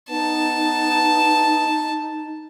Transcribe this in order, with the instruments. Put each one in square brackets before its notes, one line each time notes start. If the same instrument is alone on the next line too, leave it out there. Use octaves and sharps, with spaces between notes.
[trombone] B3 [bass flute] D#4 [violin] A5